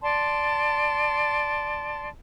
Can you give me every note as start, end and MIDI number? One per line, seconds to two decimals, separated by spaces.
0.03 2.09 74
0.03 2.09 81
0.03 2.09 84